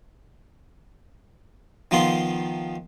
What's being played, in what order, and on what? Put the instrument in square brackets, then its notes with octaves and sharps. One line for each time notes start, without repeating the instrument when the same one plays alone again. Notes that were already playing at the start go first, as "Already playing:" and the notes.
[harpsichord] D#3 F3 B3 F4 C6